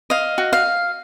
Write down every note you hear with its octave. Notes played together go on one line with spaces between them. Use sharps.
D#5 F5
F#4
F5